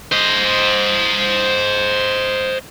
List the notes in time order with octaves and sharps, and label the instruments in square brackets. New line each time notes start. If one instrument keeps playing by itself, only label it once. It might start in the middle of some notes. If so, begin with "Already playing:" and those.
[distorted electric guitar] C5 D#5